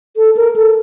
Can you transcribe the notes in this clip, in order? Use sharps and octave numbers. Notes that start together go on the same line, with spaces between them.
A4
A#4
A4